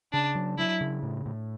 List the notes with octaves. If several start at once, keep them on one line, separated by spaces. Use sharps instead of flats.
C#3 D4
F#3
F#3 E4
C#3
A2
A2